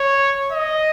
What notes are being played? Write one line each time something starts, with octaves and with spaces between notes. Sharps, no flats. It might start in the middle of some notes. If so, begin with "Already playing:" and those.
Already playing: C#5
D#5